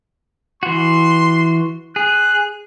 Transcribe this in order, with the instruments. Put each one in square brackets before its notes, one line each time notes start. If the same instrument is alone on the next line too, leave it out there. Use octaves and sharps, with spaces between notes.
[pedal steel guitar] E3 F#4 [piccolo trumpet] C6
[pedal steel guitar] G#4 [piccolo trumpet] F#6